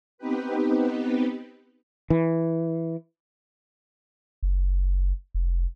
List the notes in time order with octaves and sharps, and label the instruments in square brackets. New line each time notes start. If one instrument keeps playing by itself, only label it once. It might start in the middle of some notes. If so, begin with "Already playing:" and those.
[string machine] B3 C4 D#4 G4 B4
[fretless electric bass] E3
[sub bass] F#1
F1